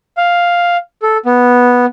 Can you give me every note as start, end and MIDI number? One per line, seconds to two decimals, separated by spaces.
0.17 0.77 77
1.02 1.17 69
1.26 1.86 59